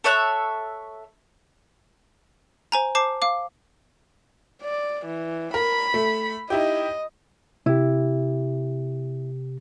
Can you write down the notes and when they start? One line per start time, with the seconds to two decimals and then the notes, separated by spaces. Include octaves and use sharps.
0.04 A4 C#5 E5 F#6
2.72 C5 G#5 A#5
2.95 C5 A5 D6 C7
3.22 F5 D6
4.62 D5
5.06 E3
5.54 A#4 B5
5.94 A3
6.50 D#4 E4 G4 D#5
7.66 C3 E4 G4